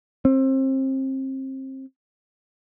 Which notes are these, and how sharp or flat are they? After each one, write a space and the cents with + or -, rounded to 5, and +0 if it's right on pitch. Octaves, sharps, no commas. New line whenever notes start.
C4 +30